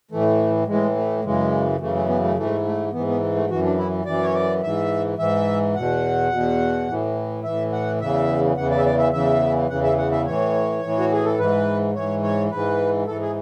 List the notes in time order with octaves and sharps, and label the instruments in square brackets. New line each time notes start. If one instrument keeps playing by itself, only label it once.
[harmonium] A2 E3 A3
A2 E3 G#3
A3
F#2 C#3 E3 G#3
F#2 C#3 E3 A3
A3
B3
A3
G#2 E3 A3
A3
G#2 E3 B3
B3
A3
F#2 E3 F#4
D4
E4
F#2 E3 D5
C#5
D5
G#2 E3 E5
G#2 E3 E5
E2 B2 F#5
E2 B2
A2 E3
A2 E3 E5
F#5
E2 C#3 E3 E5
E2 C#3 E3 F#5
D5
E5
D5
E5
E2 C#3 E3 E5
E2 C#3 E3 F#5
E5
F#5
E5
A2 E3 C#5
A2 E3
F#4
G#4
A4
G#2 E3 B4
G#2 E3 C#5
C#5
G#2 E3 B4
G#2 E3 A4
G#4